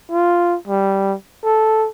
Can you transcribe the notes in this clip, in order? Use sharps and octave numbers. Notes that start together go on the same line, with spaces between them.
F4
G3
A4